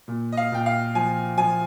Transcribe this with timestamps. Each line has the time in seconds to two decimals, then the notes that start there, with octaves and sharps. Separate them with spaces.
0.08 A#2
0.32 D#5
0.37 F5
0.52 A#2 G5
0.66 F5
0.95 F3 G#5
1.38 F3 G#5